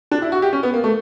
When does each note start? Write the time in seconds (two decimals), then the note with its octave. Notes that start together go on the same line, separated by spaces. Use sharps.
0.11 D4
0.22 E4
0.32 F#4
0.42 G4
0.53 C#4
0.63 B3
0.73 A#3
0.84 A3